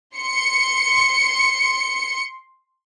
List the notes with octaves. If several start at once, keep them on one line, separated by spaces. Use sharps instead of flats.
C6 C#7